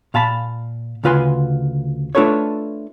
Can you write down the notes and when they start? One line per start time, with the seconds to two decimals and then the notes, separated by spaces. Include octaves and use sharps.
0.14 A#2 F5 A5 B5
1.04 D2 C#3 F4 B4 G#5 C6
2.15 A3 D4 F4 A4 B4 C#5